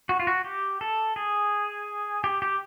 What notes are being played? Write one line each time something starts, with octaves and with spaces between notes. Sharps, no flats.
F#4
F4
F#4
G4
A4
G#4
G4
G4